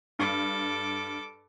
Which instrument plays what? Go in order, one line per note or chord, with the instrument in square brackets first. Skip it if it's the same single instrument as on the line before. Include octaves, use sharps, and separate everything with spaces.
[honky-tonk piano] G2 [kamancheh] A4 D6